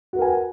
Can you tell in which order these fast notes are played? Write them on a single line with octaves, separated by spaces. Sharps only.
F#4 B4 A#4 G#5